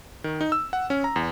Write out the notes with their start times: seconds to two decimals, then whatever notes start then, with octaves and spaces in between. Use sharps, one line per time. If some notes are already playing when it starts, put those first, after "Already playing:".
0.24 D#3
0.41 D#4
0.52 E6
0.73 F#5
0.90 C#4
1.04 A#5
1.16 E2